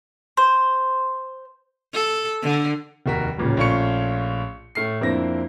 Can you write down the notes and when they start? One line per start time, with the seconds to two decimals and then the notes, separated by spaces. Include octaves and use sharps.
0.37 C5
1.93 A4
2.42 D3
3.06 F1 D#2 F#4 A#4 B6
3.37 D1 A1 A#2 C#3
3.57 A#1 A3 C#4 F4 C#6 C#7
4.75 A2 A3 F6 C7
5.01 F2 A#3 C4 D4 E4 A#6